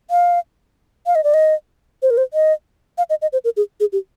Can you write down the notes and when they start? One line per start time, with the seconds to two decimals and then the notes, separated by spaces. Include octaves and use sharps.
0.11 F5
1.06 F5
1.15 D#5
1.24 D5
1.34 D#5
2.02 C5
2.10 A#4
2.17 C5
2.34 D#5
2.98 F5
3.10 D#5
3.22 D#5
3.33 C5
3.44 A#4
3.57 G#4
3.80 G#4
3.92 G4